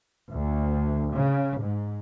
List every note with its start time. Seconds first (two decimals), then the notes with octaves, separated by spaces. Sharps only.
0.32 D2
1.14 C#3
1.61 G#2